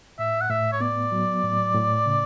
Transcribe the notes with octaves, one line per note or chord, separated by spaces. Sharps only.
A2 E5
F#5
A2 E5
C#5
B3 D5
F#3
A2
A2
C#3